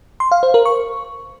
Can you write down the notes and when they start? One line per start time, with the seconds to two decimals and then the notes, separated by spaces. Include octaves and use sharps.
0.20 C6
0.32 F5
0.43 C5
0.54 A#4
0.65 C#6